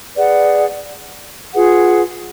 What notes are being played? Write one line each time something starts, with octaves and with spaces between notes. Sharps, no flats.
G#4 B4 D5 F#5
F4 G#4 B4 F#5